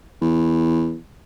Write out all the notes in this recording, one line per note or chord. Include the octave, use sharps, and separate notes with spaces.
E2